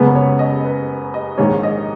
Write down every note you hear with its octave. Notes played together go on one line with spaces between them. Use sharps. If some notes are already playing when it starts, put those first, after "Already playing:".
Already playing: F#1 F#2 C#3 G#3 B3 B4
C#5
D#5
B4
D#5
A#1 G#2 D#3 C#5
D#5